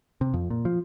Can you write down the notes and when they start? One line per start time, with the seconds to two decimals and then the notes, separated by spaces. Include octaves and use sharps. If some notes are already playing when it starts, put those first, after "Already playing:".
0.21 C3
0.34 F2
0.50 A#2
0.65 F3